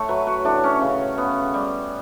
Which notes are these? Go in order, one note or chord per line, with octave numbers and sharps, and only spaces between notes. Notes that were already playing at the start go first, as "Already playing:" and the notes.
Already playing: A2 A3 C#5 E5 F#5
F#3 B4
F#4
A2 D4
C#4
C#3
B3
G3